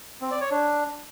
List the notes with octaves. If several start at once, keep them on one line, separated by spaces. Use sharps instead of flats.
C4
D5
C#5
D4